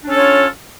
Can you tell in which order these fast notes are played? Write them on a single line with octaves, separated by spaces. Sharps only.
D4 C#4 A4 C#5 F4